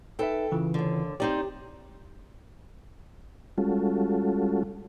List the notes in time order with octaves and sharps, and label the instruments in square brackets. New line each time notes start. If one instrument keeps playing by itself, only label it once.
[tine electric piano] D#4 B4 E5 [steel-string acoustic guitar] A4 G5
[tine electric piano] C#3 E3 F4
[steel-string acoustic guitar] D#2 D3
[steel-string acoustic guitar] C4 D#4 D5 [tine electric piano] G4
[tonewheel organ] G3 G#3 C#4 F4 F#4 A4